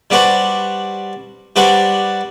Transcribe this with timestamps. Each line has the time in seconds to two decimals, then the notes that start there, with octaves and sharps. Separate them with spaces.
0.10 G3 D4 F#4 B4 C5
1.56 G3 D4 F#4 B4 C5